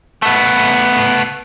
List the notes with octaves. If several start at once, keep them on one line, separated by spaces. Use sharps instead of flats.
A3 B3